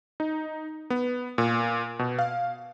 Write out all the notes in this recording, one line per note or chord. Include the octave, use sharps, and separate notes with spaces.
D#4
B3
A#2
B2
F5